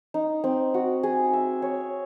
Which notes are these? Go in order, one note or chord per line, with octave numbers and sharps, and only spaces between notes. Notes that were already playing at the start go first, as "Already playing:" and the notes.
D#4
C4
F#4
G#4
E5
C#5